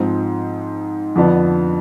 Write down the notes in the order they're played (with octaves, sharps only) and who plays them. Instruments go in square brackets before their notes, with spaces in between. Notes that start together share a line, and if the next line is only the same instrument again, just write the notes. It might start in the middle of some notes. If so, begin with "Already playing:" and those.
Already playing: [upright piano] G#2 F3 C4 D#4
F2 D3 F3 B3 D4